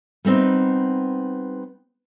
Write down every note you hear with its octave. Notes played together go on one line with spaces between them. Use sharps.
G3 B3 C4 D#4